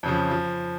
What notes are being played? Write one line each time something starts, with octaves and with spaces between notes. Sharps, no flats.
F2 C#3 F3
F3